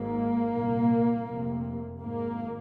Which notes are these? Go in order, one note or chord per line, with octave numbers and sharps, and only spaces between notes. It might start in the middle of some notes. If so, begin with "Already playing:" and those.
Already playing: G#1 G#2 A#3
C2 A#2
F1 F2 C3
G#1 G#2 A#3